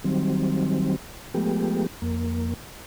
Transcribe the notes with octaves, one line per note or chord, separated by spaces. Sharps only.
D#3 F#3 G3 C4
F3 G#3 A3 B3 G4
F2 A#3